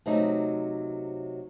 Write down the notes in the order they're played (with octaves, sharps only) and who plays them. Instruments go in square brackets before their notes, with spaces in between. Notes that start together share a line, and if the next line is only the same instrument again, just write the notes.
[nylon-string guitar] C3 F#3 A3 D#4